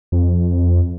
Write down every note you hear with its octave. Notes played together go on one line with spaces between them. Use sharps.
F2